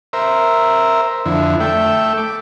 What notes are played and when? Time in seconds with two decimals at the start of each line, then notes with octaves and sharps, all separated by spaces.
0.13 A#4 C5 E5
1.26 F2 D3 E4
1.60 A3 E5 G5
2.18 D6